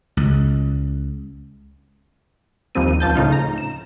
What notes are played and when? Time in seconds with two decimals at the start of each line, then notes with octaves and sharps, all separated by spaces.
0.17 C#2
2.75 D#2 F3 G3 C4 D#7
3.00 C#2 F3 A5 G6
3.15 A2 C#3 D#4 F4
3.32 A#5
3.58 E7